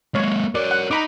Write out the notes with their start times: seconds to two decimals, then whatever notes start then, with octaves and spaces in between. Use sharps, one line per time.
0.15 G#3 A#3 C#5
0.55 A#4 C#5 D5
0.71 F#5
0.91 D#4 A#5 B5 D6